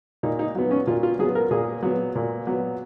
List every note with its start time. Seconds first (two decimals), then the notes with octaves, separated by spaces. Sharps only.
0.23 A#2 D#4
0.39 D#4
0.55 F#3 B3
0.71 C#4
0.87 A#2 F4
1.03 F4
1.19 F#3 G#4
1.23 B3
1.35 A#4
1.51 A#2 G#4
1.83 F#3 B3
2.15 A#2
2.47 F#3 B3